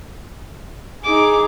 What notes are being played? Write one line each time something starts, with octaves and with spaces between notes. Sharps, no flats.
D#4 G#4 D6